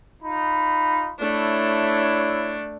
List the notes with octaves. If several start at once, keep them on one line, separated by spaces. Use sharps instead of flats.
D#4 F4 B5
A3 D4 E4 C#5